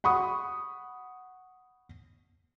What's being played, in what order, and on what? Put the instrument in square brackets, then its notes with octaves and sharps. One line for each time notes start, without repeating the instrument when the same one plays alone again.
[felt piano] F#5 B5 C#6 D#6